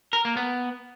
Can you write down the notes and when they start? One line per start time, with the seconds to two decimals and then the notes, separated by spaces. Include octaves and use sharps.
0.13 A#4
0.25 A#3
0.37 B3